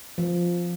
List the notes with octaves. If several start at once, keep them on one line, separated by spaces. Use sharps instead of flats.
F3